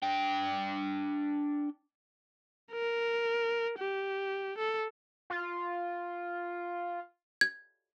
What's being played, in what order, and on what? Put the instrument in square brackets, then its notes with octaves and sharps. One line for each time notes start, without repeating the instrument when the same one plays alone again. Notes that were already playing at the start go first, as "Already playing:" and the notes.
[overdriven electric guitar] D4 G5
[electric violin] A#4
G4
A4
[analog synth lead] F4
[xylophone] G#6